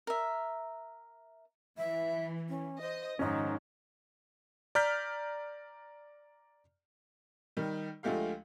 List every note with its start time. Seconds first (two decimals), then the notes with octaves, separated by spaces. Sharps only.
0.07 A#4 E5
1.78 E3 E5
2.49 C#4
2.81 C5 D#5
3.19 G#2 D#3 F3 C#4 D#4
4.75 D5 A#5 F6 G6 B6
7.57 D#3 G3
8.03 D2 F3 G#3 A3 G4 F5